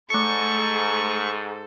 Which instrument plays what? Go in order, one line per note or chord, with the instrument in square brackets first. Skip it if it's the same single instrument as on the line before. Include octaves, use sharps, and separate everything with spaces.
[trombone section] G#2 [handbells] A3 C#7 [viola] A4 C5 [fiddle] C#6